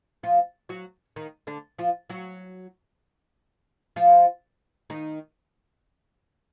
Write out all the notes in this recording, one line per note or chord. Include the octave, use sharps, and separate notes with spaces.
F3 F4
F#3 F#4
D#3 D#4
D3 D4
F3 F4
F#3 F#4
F3 F4
D#3 D#4